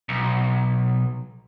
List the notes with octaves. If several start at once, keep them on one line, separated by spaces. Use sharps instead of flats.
B1